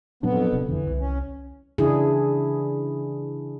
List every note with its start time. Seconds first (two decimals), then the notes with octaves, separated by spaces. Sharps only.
0.23 F2 A#2 F#3 B3 D4
0.52 D#1 C3 D4
0.69 F2 D3 E3
0.87 C2
1.00 C#4
1.78 C#3 E3 D4 E4 G#4